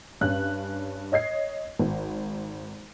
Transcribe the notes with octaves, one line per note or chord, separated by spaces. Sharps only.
G2 C#4 F#6
C#5 D#5 G#6 C7
G#1